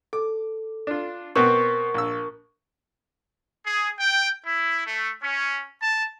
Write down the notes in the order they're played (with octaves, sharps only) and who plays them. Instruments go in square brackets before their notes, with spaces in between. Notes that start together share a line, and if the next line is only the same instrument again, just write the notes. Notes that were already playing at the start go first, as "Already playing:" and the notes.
[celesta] A4 [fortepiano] D6
[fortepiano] D4 F4
[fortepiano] B2 B3 C4 [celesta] A#4 C#6
[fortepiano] A#1 E6
[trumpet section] G#4
G5
E4
A3
C#4
A5